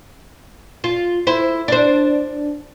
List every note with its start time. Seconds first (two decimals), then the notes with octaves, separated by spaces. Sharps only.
0.84 F4
1.27 E4 C5
1.68 D4 C5